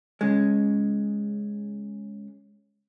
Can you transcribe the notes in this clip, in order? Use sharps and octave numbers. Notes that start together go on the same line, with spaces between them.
C#3 G#3